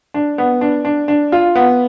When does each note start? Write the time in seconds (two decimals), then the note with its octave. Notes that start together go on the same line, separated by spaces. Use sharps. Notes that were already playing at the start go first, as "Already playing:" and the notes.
0.14 D4
0.38 B3
0.61 D4
0.85 D4
1.08 D4
1.32 F4
1.55 B3